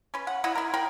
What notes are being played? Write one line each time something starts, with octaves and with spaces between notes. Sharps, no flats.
C#4 B4
F#5
E4 D#5 F#5 B5
E4 A#4
A#4 G5 B5